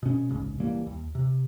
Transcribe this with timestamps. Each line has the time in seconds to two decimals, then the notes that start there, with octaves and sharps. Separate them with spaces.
0.03 B2 C#4
0.29 D1 A#1 G#2 C#3
0.60 C#2 E3 G3 A#3
0.87 D#2
1.15 C3